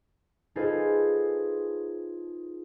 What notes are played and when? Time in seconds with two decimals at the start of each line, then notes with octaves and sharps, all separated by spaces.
0.56 D#4 F4 G#4 A4 B4 C5